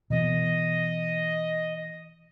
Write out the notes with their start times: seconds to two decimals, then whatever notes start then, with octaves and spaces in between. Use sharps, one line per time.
0.10 B2 E3 B3 D#5